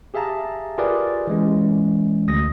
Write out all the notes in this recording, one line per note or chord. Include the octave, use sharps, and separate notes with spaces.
G4 G#4 E5 F5 A5 A#5
F4 G4 G#4 A#4 B4 D5
E3 G#3 C#4
D2 D#6 A#6